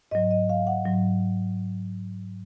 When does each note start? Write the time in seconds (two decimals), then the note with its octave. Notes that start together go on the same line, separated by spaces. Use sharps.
0.11 G#2 F#3 D#5
0.31 D#5
0.49 F5
0.67 F#5
0.85 G#2 F#3